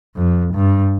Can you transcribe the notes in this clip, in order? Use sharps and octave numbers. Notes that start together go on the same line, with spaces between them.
F2
G2